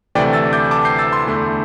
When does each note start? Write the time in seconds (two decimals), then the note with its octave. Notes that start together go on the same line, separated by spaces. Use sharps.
0.15 D2 C3 E3 A3 D5 G5
0.33 E6 A6
0.53 D6 G6
0.71 A5 D6
0.85 G6 C7
0.99 E6 A6
1.13 C6 E6
1.27 E2 D3 A3 E4